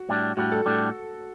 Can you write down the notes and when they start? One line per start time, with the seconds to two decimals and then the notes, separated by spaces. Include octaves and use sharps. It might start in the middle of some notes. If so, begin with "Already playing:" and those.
Already playing: F#4
0.09 A2 G3 D4
0.37 A2 G3 D4 F#4
0.52 A4
0.66 A2 G3 D4